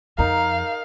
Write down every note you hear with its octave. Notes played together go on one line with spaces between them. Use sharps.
F2 D#4 A#4 F5